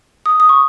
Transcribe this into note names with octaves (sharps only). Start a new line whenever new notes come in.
D#6
D#6
C#6